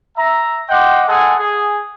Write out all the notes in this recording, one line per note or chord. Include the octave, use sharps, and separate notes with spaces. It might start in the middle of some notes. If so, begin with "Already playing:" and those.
E5 A#5
D#5 F#5 G5 C6 D6
G#3 G#4 A4 F#5 G#5
G#4